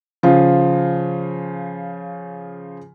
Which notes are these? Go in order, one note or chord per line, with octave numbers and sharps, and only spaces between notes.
C#3 F3 F4